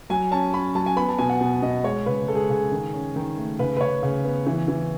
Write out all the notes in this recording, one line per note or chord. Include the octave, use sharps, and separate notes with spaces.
F#3 G#5
C#4 A5
C#4 B5
F#3 A5
G#5
B3 B5
A5
B2 G#5
F#5
B2
B2 D#5
G#3 C#5
C#3 B4
G#3 A4
G#4
C#3 G#4
D#3
C#4
D#3
A3
C#3 B4
B4
C#3 C#5
C#3
B3
E3
E3